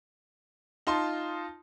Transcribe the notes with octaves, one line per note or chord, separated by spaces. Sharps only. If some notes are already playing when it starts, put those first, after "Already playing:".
D#4 F4 A5 C6